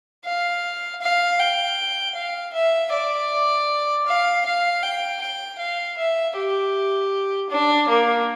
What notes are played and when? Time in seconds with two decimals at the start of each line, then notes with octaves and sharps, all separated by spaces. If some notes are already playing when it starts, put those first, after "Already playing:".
0.25 F5
1.01 F5
1.39 G5
2.16 F5
2.54 E5
2.92 D5
4.06 F5
4.45 F5
4.83 G5
5.21 G5
5.59 F5
5.98 E5
6.36 G4
7.50 D4
7.88 A#3